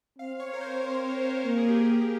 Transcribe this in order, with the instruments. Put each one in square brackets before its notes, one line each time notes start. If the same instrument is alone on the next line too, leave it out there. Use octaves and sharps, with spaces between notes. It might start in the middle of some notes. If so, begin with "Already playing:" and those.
[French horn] C4 [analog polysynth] F5
[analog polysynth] C#5
A#4
C5
A#4
[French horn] A#3 [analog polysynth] A#4
[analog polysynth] G#4
G4
G#4